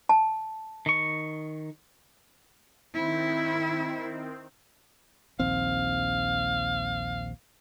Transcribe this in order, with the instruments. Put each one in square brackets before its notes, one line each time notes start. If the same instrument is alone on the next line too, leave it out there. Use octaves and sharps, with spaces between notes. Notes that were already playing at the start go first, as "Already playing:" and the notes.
[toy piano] A5
[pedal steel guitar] D#3 C#6
[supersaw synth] D#3 C4 [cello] E4
[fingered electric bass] A#1 D#2 C4 [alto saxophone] F5